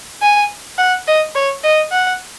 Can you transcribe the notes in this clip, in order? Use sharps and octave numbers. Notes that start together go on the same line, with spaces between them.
G#5
F#5
D#5
C#5
D#5
F#5